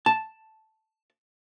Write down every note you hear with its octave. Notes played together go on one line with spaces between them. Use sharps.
A5